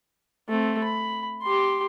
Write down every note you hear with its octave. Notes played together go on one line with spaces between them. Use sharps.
A3 C4
B5
G4 C6